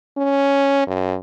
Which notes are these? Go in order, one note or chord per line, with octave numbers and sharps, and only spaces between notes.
C#4
F#2